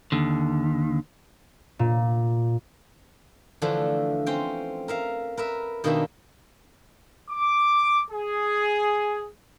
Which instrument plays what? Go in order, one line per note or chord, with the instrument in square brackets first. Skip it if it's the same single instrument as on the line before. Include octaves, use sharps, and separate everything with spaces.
[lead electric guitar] D#2 D3
[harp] A#2
[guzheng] D3 E3 F3 A3 D4
C4 C#4 G5
A#4 E5 F5
A#4 B4 E5
B2 D#3 A#3 D4 G4 E5
[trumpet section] D6
G#4